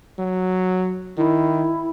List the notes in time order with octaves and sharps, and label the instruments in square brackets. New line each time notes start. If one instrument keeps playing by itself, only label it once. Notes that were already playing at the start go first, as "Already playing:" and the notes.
[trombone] F#3
[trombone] D#3 [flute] E4